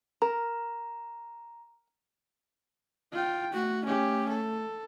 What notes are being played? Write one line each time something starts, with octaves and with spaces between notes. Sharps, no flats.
A#4 A#5
F4 G5
A3 F#4
C#4 G4
A4